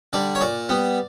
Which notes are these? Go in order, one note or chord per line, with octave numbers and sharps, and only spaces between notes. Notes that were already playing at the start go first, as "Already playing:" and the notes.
D3 G3 D5
C#5
A#2 D5
G3 B3